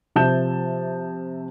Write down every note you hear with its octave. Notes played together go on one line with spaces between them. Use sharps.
C3 F3 E5 A5 G6 E7